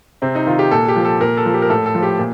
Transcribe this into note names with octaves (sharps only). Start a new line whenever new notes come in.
C3 C4
D#4
D#3 F4
G4
A#2 A4
G4
F3
A4
A#2 A#4
A4
F3
G4
A#4
A2 A4
A4
F3
G4
A#2